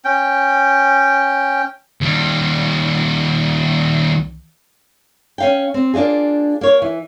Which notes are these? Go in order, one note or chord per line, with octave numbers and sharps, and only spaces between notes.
C#4 G5
D#2 G3
C#4 F5 G5
C4
A#3 D4 D#4 F4 G#4
A#3 C#5
E3